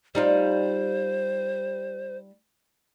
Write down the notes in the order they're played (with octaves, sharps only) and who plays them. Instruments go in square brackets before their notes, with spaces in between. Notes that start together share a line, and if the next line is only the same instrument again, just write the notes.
[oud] G3 D#4 F4 [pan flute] C5